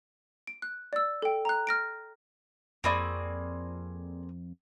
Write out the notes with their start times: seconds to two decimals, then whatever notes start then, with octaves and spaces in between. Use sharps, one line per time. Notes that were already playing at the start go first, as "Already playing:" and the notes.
0.47 D7
0.62 F#6
0.93 D5 E6
1.22 A4 G5
1.45 A#5 F#6
1.67 F6 A#6 D7
2.84 F2 A#3 C4 G#4 D5 B5 C#6